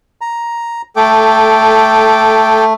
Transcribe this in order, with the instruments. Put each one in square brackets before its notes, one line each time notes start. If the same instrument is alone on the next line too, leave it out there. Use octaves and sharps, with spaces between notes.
[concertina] A#5
[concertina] A3 [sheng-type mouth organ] A4 G5 D6